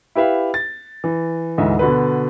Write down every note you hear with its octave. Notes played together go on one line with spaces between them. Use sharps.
E4 G4 B4 E5 F5
A6
E3
D2 G#2 E3 D#5 E5
B2 D3 B4